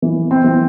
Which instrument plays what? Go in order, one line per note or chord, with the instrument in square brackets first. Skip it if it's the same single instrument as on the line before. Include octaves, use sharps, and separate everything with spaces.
[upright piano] E3
C4
E3